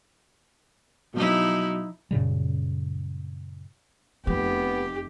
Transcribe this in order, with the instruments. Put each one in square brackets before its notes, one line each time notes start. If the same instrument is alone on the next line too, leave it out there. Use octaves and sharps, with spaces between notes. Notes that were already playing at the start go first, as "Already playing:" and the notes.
[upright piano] B2 F#3 [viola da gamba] F3 D#4 E4
[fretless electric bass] F#2 A#2 C#3 G3
[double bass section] F1 [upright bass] F3 [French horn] B3 [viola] G4